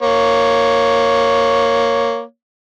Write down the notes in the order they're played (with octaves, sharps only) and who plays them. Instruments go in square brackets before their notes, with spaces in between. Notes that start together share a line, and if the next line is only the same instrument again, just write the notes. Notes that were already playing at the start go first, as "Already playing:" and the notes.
[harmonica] A#3 C#5